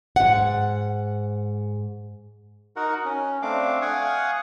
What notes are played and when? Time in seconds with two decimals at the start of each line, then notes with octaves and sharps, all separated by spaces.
0.16 G#2 F#5
2.76 D#4 F#4 A#4 F#5
3.05 C#4
3.42 A3 C4 D4 F5 D6
3.82 F5 F#5 G#5 C#6 D#6